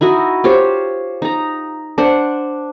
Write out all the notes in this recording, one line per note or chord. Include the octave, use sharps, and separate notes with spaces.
D#4 E4 F#4 D#5
F4 G4 C5 C#5
D#4 A#5
D4 C5 F#5